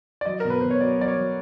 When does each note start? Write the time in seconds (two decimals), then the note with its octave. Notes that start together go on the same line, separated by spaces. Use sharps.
0.21 D5
0.26 F#3 D#5
0.40 B2 A#4
0.50 B4
0.60 B2 C5
0.71 C#5
0.80 F#3 D5
0.99 F#3 D5
1.08 C#5
1.17 F#3